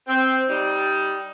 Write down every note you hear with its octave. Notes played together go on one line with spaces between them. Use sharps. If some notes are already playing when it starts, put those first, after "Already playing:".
C4
G3 D#4